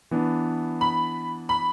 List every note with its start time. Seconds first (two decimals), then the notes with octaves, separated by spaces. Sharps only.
0.11 E3 B3 D4
0.81 B5
1.49 B5